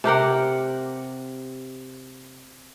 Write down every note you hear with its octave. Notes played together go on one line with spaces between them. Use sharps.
C3 G4 A#4 F#5